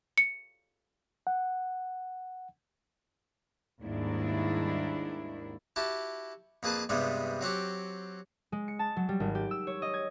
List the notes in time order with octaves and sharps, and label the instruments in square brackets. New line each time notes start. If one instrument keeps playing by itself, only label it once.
[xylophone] C#7
[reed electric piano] F#5
[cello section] D#2 G#2 D#3 G3 D4 E4
[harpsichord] E4 F#4 G4 A5
F2 A#3 G#4 B4 A5 B5
G2 C3 G3 G#3 B3
F#3 C4 F#4 G4
[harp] G#3
C#7
A5
F#3
G3
G#1
G4
E6
C#5
D#5
G#6